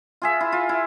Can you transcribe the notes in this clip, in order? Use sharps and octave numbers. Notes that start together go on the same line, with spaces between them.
F4 G#4 E5
E4
F4
E4